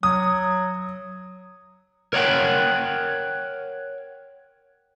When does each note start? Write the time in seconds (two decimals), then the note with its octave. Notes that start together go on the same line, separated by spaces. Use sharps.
0.03 F#3 D#6
2.13 A#4 C#5 D5 F#5 G5